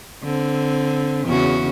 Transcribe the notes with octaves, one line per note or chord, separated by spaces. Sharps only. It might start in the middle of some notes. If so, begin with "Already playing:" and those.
D3 C4
E2 C#3 F#4